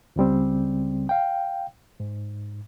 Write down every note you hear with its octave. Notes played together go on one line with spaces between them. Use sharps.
C#2 C#3 G3 C4
F5 G5
G#2